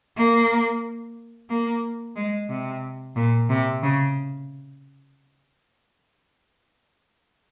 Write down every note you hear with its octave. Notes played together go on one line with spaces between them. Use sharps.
A#3
A#3
G#3
C3
A#2
C3
C#3